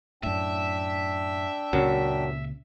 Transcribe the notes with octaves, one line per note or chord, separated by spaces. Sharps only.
F#2 A2 D4 E5 G5
C#2 F#2 A#2 C#3 F#3